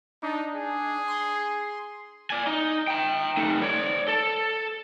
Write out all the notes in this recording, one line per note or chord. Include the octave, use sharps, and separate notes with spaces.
D4 D#4
G#4
C6
D5 G#5
D#4
G5 A#5
A3 D#4
C#5 D5
A4